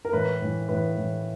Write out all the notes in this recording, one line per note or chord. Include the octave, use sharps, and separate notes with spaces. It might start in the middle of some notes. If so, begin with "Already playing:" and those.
A#4
A2 E3 B4
A2 E3
A2 E3 B4
A2 E3